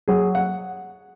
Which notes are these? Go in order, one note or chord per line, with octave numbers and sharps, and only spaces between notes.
F#3 G#4
F#5